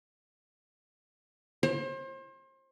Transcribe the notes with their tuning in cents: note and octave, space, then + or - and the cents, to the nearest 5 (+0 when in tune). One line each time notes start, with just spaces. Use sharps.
C5 +35